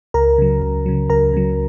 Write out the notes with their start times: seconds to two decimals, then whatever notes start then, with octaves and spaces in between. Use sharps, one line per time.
0.14 C#2 A#4 A#5
0.38 C#3 F#3
0.62 C#2
0.86 C#3 F#3
1.09 C#2 A#4 A#5
1.34 C#3 F#3